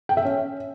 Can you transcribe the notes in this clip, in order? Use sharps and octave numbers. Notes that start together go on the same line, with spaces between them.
G5
E5
C#4